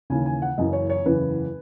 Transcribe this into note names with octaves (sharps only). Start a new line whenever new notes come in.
D#2 C#3 E3 G#5
G#5
F#5
F#1 F#2 C#3 E3 D#5
C#5
C#5
F#1 E2 C#3 E3 B4